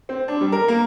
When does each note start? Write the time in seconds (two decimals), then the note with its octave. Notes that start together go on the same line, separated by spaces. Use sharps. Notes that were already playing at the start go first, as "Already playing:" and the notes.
0.09 C4
0.28 D4
0.41 G3
0.52 A#4
0.68 A#3